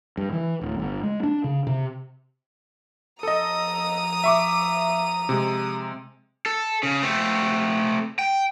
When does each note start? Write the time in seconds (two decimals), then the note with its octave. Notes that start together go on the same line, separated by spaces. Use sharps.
0.18 G2
0.32 E3
0.61 D1
0.79 G1
1.03 G#3
1.23 D4
1.44 C#3
1.67 C3
3.23 F3 A4 D#5 A#5 D#6
4.24 E5 C#6 D6
5.29 C3 G#3
6.46 A4
6.83 C#3
7.02 A3 C4
8.19 G5